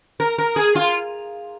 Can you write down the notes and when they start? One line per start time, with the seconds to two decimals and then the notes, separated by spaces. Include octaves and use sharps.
0.20 A#4
0.38 A#4
0.56 G#4
0.75 F4